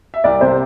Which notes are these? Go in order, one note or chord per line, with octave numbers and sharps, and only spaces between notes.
E5
C2 D5
C3 C5